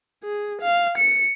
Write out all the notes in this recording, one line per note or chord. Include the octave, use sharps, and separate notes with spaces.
G#4
F5
C#7